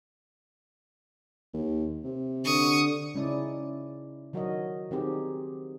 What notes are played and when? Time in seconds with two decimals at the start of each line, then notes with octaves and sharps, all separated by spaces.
1.54 D#2
2.04 C3
2.45 D3 C#6 D#6
3.15 C#3 G#3 C#4 D#4 E4 D5
4.33 D#3 F#3 F#4 A#4 C#5 D#5
4.91 D#3 C4 D#4 G4 G#4